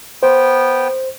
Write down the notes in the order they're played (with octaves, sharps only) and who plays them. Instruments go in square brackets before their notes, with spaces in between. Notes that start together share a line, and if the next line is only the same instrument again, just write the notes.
[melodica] B3 G5 [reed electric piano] C5